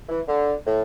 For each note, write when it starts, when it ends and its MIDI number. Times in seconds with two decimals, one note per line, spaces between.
0.09 0.20 52
0.28 0.54 50
0.66 0.82 45